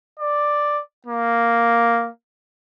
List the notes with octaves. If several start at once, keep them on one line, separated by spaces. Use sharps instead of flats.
D5
A#3